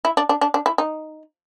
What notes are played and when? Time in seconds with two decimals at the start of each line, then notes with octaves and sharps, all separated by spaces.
0.05 E4
0.17 D4
0.29 D4
0.41 D4
0.54 D4
0.66 E4
0.78 D#4